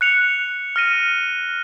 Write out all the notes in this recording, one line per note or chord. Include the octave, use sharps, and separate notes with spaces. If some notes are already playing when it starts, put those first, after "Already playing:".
F#6 C#7 F7
F6 A#6 D#7